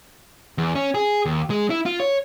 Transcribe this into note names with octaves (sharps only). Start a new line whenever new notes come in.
E2
C#4
G#4
D#2
G#3
E4
F4
C#5